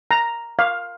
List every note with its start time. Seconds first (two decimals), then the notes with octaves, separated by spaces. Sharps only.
0.11 A#5
0.59 F5